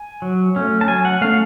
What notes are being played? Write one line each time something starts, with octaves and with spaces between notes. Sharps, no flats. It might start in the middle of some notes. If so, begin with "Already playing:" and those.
Already playing: G#5
F#3
A3 C#4
A5
F#3 G#5
F#5
A3 C#4 F5